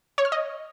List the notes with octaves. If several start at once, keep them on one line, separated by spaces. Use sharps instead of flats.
C#5
F6
D#5